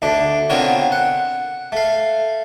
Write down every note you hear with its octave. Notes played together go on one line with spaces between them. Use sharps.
D2 A3 D4
D3 B3 C4 F4 A#4 C#5
F#5
A3 F5